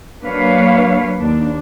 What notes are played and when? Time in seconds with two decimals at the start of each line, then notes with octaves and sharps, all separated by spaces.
0.24 F#3 A#3 D4 B4 C#5 F5
1.20 D#2 D4